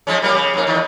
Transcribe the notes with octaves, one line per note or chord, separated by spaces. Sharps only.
F3 G#3 C#4
G3 A#3 G4
C#3
F2 G#2 A#3
E2 D#3